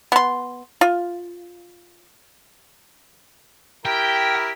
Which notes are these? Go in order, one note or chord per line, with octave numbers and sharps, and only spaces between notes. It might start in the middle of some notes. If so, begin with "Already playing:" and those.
B3 C6
F4
E4 G4 A#4 G5